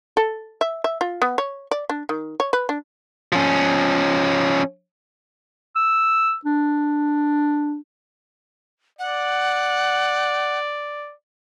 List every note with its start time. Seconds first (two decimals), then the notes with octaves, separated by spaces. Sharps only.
0.17 A4
0.61 E5
0.84 E5
1.01 F4
1.22 B3
1.38 C#5
1.71 D5
1.89 D4
2.09 D#3
2.40 C#5
2.53 B4
2.69 D4
3.32 F3 C#4
5.76 E6
6.45 D4
8.99 D5 F#5